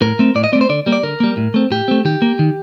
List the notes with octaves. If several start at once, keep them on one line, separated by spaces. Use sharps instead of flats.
A2 A#4
A3 C4
A2 D5
D#5
A3 C4 D5
C5
D3 D5
G3 A#3
D5
D3 A#4
G3 A#3
A2
A3 C4
A2 G4
A3 C4
D#3 G4
A#3
D#3